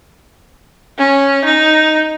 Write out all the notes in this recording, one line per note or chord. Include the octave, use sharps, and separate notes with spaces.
C#4
D#4